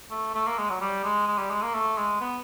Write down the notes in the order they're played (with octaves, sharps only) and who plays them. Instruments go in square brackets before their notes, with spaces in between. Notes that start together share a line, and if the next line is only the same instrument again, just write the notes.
[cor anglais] A3
A3
A#3
G#3
F#3
G3
G#3
G#3
G3
G#3
A#3
A3
G#3
B3